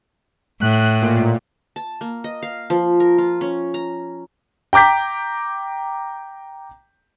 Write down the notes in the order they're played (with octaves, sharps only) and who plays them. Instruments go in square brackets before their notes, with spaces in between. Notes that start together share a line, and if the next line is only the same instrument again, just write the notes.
[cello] A2 [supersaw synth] F#6
[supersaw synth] A#2
[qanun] A5
A#3
D#5
F5
F3
A#4
F4
C#4
A#5
[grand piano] G5 A#5 D6 G6 B6